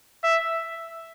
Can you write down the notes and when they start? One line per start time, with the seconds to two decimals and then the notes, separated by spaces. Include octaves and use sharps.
0.24 E5